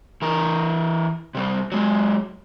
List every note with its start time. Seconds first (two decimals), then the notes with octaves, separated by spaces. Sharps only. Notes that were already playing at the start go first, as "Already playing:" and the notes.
0.22 E3 A#4
1.35 C3 G3
1.72 F#3 G#3